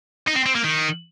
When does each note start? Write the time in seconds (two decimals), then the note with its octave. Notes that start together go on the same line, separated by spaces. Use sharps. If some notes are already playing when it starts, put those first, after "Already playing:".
0.27 D#4
0.36 C4
0.46 C4
0.55 A#3
0.64 D#3